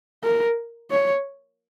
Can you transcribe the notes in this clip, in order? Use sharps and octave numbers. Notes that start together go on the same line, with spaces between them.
A#4
C#5